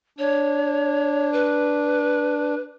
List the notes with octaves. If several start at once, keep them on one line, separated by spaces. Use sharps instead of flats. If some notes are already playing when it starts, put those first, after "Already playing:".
D4 C#5
B4